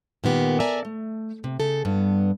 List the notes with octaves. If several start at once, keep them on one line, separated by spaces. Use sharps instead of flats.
A#2 D#3 B3 G4
A4 A#4 D5 E5 G#5 A#5
A3
C3
C#3 A4
G2 B3